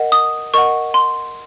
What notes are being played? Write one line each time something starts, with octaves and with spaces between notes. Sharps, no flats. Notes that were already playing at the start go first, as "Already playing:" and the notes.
Already playing: A#4 D#5 F#5
D#6
A#4 D#5 F#5 C#6
C6